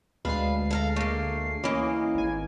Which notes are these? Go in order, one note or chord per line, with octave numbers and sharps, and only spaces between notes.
D2 G#3 D4 B4 F5 C7
A4 F5 A#5
A3 A#3
E3 A#3 C#4 D#5
G#1 G#5